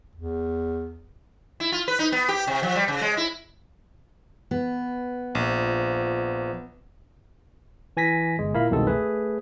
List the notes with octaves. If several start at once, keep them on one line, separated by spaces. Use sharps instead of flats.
E2
E4
F4
B4
D#4
B3
G4
C3
F3
G3
C#3
G#3
E4
B3
A#1 F3
E3 G#5 A#6 B6
G1 G#3
A#2 E4 A#4 F5 B5
C2 F2 B2 D#3 G#3 A4
A3 G#4 B4